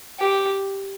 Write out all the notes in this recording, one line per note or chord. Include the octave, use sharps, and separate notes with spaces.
G4